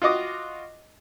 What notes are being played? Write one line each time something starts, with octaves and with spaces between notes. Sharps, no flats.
F4 F#4 D#5 D6 D#6